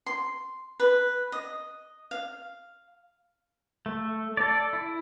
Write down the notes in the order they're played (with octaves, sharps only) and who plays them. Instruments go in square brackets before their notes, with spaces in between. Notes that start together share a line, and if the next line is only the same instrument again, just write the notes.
[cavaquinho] C6
B4
D#5
F5
[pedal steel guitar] A3
A4 D5
E4